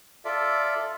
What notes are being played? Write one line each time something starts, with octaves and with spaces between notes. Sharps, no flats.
F4 A4 D5 E5